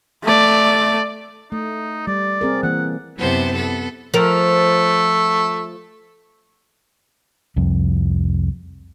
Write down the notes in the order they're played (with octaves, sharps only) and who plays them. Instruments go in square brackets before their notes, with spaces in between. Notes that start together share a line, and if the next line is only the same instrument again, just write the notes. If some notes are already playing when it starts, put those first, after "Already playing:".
[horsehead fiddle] A3 D5
[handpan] A3 [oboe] D#4
[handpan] G3 [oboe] D5
[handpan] C4 G#4 A#4
[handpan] E3 A#3 [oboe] F#5
[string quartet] F#2 C3 B3 E4 C5 A5
B3 A4
[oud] F3 A#4 [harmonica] A3
[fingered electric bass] C2 F2